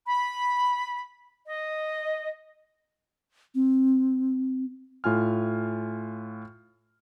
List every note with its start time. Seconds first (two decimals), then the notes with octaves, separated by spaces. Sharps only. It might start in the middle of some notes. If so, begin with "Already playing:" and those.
0.06 B5
1.46 D#5
3.55 C4
5.04 A2 F4 G#5 F6